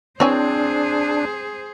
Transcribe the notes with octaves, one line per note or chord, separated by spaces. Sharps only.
E3 C4 D4 G#4 C5 C#5 G#5